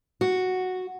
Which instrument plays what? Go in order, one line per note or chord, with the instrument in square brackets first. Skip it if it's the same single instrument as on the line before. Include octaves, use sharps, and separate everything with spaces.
[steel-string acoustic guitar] F#4